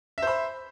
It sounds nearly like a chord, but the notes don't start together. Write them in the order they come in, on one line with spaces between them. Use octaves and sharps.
E5 C5 B5